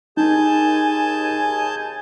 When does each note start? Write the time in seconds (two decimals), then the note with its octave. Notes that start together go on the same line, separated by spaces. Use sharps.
0.17 D#2 D#4 G#4 G#5 A5 G6